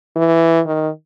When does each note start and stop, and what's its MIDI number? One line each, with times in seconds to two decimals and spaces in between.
0.16 0.60 52
0.66 0.89 51